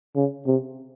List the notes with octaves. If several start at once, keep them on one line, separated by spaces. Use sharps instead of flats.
C#3
C3